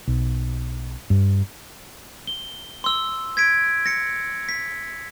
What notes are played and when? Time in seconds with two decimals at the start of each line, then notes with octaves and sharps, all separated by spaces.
0.08 B1
1.10 G2
2.27 G7
2.84 C6 E6
3.37 G#6 B6 D7
3.86 A#6 C#7
4.49 B6